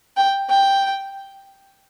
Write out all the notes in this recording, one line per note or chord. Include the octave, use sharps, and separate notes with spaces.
G5
G5